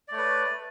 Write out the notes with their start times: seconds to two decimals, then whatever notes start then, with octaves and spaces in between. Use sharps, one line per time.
0.08 D5
0.11 A3
0.14 C#5
0.17 B4